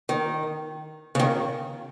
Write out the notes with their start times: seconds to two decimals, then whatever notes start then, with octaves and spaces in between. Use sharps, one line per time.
0.09 D#3
1.15 C#3
1.19 D#3